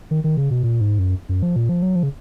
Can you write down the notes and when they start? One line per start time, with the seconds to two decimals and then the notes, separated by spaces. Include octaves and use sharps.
0.11 D#3
0.24 D#3
0.37 C#3
0.51 B2
0.63 A#2
0.81 G#2
0.99 F#2
1.29 F#2
1.43 F3
1.56 A#2
1.69 F3
1.82 F#3
1.96 F3
2.03 C#3